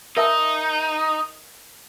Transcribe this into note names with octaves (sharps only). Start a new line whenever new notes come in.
D#4 A#4 E5 A5